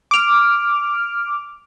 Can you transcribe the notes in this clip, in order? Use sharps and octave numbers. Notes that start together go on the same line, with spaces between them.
D6 F6